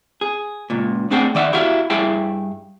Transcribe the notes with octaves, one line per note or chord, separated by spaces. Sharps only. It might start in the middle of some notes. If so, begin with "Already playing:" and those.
G#4
C#2 A#2
A3 C4 D4 G#4 F#5 G5
D#3 D5 E5 F#5
E4 F#4 G4 E5 F5
G2 E4 G#4 E5 G5